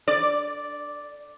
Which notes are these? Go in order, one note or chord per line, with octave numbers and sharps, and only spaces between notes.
D5